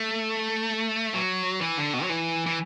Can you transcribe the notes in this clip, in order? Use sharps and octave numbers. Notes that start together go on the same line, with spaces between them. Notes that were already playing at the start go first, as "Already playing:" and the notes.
Already playing: A3
F#3
E3
D3
B2
F#3
E3
E3